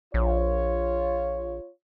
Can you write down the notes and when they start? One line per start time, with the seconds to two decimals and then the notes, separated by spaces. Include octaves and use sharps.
0.14 A#1 F4 C#5